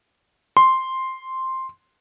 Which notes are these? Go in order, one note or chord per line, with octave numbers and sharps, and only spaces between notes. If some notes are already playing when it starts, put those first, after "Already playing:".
C6